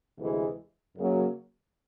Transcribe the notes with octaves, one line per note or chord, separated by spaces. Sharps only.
D2 C3 E3 G#3
F#2 C#3 F#3 A#3